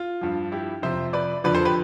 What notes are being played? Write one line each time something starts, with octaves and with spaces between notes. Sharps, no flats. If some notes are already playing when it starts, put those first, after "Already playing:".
Already playing: F4
G2 F3
E4 G4
F2 C3 F3 C5 E5
B4 D5
F2 D3 F3 B4 D5
A4 C5
G4 B4